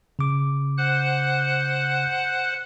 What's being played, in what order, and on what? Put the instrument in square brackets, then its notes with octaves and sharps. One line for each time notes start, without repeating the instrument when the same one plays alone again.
[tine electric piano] C#3 D6
[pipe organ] C5 F#5 F#6